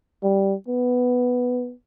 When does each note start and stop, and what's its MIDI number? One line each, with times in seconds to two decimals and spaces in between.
0.23 0.54 55
0.68 1.73 59